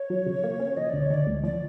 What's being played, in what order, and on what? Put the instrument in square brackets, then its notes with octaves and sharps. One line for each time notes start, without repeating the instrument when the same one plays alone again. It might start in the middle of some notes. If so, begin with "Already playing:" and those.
Already playing: [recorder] C#5
[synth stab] F#3
C#3
A#3
C#4
[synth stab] F3 [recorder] D#5
[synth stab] D2 [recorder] D5
[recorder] C#5
[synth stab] D3 [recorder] D5
[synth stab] D2
[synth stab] F3 [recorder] D5